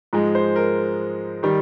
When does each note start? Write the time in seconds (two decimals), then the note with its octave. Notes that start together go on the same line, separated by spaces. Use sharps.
0.13 G#2 F3 G#3 D#5
0.35 C5
0.56 A#4
1.43 D#3 G3